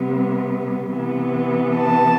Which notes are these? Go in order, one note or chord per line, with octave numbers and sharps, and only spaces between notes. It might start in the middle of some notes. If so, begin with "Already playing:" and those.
Already playing: C3 G3 B3
C3 E3 B3
A5